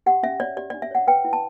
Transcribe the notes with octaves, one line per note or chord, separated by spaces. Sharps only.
G4 F#5
C#4 E5
C#5 D5
G4 D5
D5
D4
E5
C#5 F#5
B4 G5
E4
A5